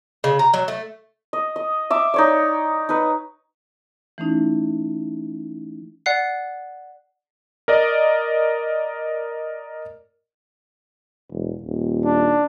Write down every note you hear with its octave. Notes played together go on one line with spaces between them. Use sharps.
C#3
A#5
F#3
A3
D#5
D#5
E5 D6
D#4 C#5 D5
D#4 B4
E3 A3 C#4 D#4 E4
D5 F#5 F#6 C7
A#4 D5 D#5
E1
D#1
D4